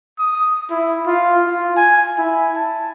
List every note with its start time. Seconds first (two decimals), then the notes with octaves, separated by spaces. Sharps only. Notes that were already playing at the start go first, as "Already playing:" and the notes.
0.19 D#6
0.70 E4
1.06 F4
1.46 F4
1.76 G#5
2.18 E4
2.56 A5